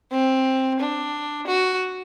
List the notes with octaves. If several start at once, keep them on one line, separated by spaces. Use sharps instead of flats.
C4
D4
F#4